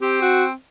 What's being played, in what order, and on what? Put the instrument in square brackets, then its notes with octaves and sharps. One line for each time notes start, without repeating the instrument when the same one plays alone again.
[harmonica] C4 [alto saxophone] G4
[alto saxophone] F#4